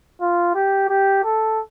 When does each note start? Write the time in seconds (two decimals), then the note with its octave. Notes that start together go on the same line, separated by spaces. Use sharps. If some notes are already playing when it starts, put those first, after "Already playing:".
0.21 F4
0.55 G4
0.89 G4
1.24 A4